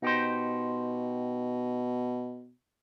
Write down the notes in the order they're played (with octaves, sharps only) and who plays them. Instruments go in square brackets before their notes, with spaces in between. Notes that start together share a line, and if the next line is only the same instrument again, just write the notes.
[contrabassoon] B2 [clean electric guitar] D#4 G4 C5